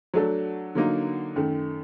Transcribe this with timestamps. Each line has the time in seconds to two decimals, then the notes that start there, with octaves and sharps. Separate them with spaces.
0.14 F#3 A3 D4 A4
0.75 D3 F#3 A#3 D#4
1.36 F#2 D#3 A3